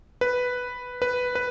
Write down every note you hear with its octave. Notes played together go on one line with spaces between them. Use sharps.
B4
B4
B4